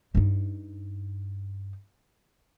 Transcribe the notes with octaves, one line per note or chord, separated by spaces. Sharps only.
G2 D#4